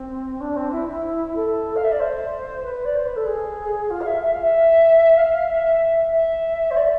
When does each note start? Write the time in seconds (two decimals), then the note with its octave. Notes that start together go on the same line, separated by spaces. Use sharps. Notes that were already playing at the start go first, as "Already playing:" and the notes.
Already playing: C4
0.40 D4
0.56 C4
0.71 E4
0.88 E4
1.35 A4
1.76 F5
1.83 E5
1.91 D5
1.99 C5
2.63 B4
2.85 D5
2.95 C5
3.05 B4
3.16 A4
3.26 G#4
3.90 F4
4.01 F5
4.06 E5
4.21 E5
4.32 F5
4.42 E5
5.17 F5
5.48 E5
6.12 E5
6.70 C5
6.76 D5